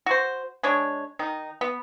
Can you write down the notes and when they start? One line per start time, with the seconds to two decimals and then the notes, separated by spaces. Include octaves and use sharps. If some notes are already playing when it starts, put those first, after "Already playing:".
0.06 F#4 C5
0.63 G#3 D4 C#5
1.19 D#3 D#4
1.61 B3